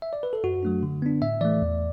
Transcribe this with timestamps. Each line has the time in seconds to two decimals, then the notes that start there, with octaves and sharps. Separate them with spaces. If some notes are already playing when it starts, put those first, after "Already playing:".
0.02 E5
0.13 D5
0.23 B4
0.33 A4
0.44 F#2 F#4
0.63 F#3 A3 D4
0.83 D3
1.02 B3 D4
1.22 A2 E5
1.41 E3 A3 D5
1.62 E2